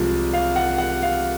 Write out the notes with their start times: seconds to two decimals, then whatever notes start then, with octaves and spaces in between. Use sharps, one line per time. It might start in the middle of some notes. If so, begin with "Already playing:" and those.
Already playing: C2 C3 F3 G#3
0.33 F5
0.56 F#5
0.78 F#5
1.02 F5